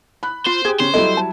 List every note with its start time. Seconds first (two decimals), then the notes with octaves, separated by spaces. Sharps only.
0.23 B5 F#6
0.47 F4 C5
0.65 G4 G#4 G#6
0.80 C#3 C#4 C5
0.94 F#3 G3 E4 A4 D#5
1.17 A5